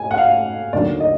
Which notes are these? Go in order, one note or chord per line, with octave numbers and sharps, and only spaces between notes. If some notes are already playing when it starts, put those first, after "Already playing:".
Already playing: G#5
F#5
F5
D#2 D3 F#3 D5
D#5